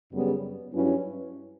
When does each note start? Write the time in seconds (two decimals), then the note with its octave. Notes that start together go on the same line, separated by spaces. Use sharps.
0.12 F#2 C#3 G3 B3
0.72 G2 F#3 C#4 E4 B4